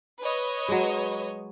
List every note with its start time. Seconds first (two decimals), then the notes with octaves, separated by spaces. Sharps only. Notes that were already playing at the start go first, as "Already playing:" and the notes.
0.20 B4 C#5 D#5
0.68 F#3 G#3